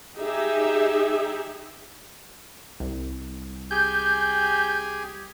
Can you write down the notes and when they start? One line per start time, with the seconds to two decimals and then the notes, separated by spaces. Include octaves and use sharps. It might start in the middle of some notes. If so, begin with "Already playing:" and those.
0.17 D#4 G4 G#4 E5
2.80 C2
3.71 G4 G#4 G#5 G6